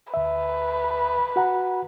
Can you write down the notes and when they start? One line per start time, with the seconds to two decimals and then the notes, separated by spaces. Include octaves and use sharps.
0.14 D2 B4 E5
1.36 F#4 F#5 A#5